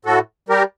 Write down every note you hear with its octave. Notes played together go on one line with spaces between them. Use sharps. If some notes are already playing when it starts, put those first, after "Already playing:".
A2 F#4 A4
G3 G4 A#4